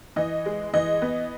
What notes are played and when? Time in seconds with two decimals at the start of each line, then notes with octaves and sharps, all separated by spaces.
0.16 E3 D#5
0.46 G#3
0.74 E3 D#5
1.02 B3